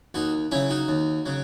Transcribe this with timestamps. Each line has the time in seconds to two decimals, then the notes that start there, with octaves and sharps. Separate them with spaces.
0.14 D#2 D#4 F#4
0.51 C#3 F#3 C#4 E4
0.70 D#4 F#4
0.88 D#2
1.26 C#3 F#3